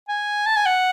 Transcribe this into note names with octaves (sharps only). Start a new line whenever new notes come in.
G#5
A5
G#5
F#5